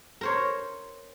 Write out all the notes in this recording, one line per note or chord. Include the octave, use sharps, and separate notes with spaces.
A#4 C5 C#5